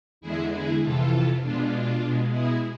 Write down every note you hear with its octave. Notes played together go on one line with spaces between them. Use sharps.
E2 D3 G#3 E4 G#4
E4 G#4
F2 C3 E3 F4 A4
B2 G#3 D4 F4
B2 G#3
E4 G#4